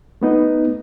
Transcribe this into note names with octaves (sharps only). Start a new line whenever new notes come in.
A3 B3 D#4